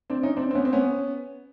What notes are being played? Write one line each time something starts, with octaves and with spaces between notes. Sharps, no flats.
C4 D4
C#4 D#4
C4 D4
C4
B3 C#4
C4
B3 C#4